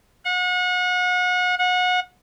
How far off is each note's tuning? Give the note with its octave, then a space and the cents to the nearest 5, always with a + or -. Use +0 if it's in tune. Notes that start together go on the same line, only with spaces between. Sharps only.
F#5 -35
F#5 -30